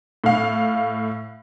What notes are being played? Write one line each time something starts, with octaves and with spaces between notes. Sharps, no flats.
A2 F5